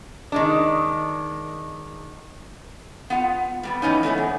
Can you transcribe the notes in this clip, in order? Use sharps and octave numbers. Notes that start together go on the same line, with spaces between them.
D#3 G#3 D4
B3 F4 F#5
G3 A#3 B3
E3 B3 C#4 D#4
G#3 A3 E4 C#5
E2